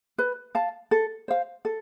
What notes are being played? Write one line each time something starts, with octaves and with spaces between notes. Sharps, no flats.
B4
F5 A5
A4
C5 F5
A4